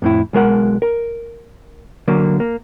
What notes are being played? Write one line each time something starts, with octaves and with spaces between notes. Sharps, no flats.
F2 A2 E4
B1 G#3 A#4 F#5
A#4
D3 F#3 A#3
A#3